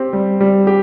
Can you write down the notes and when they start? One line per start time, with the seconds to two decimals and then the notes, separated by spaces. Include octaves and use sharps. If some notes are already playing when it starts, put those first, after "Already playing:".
Already playing: C4 G4
0.13 G3
0.41 G3
0.67 G4